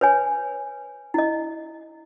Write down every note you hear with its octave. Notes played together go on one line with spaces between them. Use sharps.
B4 C#5 G#5
E4 D#5